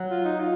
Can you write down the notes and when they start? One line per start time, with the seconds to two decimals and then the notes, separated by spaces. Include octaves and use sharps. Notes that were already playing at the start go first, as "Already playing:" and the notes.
Already playing: F#3
0.09 F4
0.24 D#4
0.39 F4